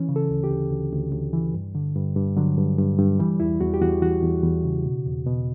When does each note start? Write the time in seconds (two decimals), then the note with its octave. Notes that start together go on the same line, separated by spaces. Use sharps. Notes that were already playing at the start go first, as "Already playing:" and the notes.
Already playing: E3 C#4
0.09 C#3
0.16 A4
0.30 D2
0.44 G4
0.50 D2
0.71 D2
0.92 D2
1.12 D2
1.33 E3
1.54 G2
1.75 D3
1.95 G2
2.16 G2
2.37 D3 F#3
2.58 G2
2.78 G2
2.99 G2
3.19 E3 G3
3.40 E2 E4
3.60 E2 F#4
3.74 G4
3.82 E2 F#4
4.02 E2 F#4
4.23 E2
4.44 E2
4.64 C#3
4.85 B2
5.06 E2
5.27 B2